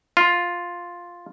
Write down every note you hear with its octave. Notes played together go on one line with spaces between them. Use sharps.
F4